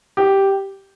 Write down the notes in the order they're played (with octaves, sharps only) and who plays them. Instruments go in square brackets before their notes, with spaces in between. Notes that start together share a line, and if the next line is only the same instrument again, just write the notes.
[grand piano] G4